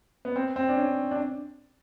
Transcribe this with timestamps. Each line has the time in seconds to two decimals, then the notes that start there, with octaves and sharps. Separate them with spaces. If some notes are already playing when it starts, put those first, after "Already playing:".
0.25 B3
0.36 C4
0.56 C4
0.69 D4
0.77 C#4
1.11 D4